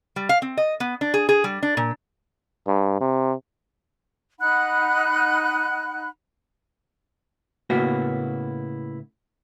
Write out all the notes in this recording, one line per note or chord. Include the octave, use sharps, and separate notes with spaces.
G3
F5
C4
D#5
B3
D4
G#4
G#4
G3
D4
A#2
G2
C3
D#4 F#5 B5 F#6
A2 C#3 A#3 B3 E4 F#4